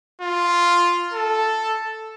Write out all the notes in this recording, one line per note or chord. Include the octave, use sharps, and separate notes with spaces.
F4
A4